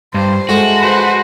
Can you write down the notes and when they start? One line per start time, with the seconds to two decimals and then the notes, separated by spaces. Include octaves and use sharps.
0.14 G2 C5
0.49 G#3 A3 F#4
0.79 B4 C5